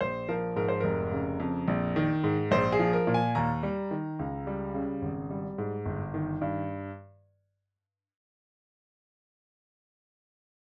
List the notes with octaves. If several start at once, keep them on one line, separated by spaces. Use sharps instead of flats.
A#1 C5
F3 A#4
G#2 A#4
C5
F1 A#4
C#3
F2
A#1
D#3
G#2
A#1 C5
G#4
F3
A#4
A#2
G#5
D#2 A#5
G3
D#3
C#2
G3
C#3
G#1
G3
G#2
G1
D#3
G2